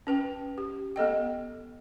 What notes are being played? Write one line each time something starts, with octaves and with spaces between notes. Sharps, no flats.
C#4 B4 G5
G4
B3 A4 D#5 G5